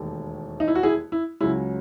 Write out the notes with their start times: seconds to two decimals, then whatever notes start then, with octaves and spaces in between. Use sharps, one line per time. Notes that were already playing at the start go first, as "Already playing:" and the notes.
Already playing: E1 D#2 D#3 A3
0.60 D#4
0.68 E4
0.75 F#4
0.83 E4 G#4
1.12 E4
1.41 C#2 C#3 F#3 E4